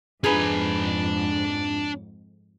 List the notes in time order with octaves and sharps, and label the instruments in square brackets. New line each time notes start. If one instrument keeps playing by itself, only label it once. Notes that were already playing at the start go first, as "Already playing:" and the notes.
[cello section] F2 G#2 [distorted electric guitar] D4 A#5 [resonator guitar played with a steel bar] G#4 B4